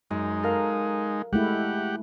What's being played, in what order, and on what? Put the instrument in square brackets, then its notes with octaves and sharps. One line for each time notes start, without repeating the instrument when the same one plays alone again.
[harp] F#2 [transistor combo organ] G#3 D#4
[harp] A4 A#4 F5
[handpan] G#3 A3 E4 [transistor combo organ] G4 F#5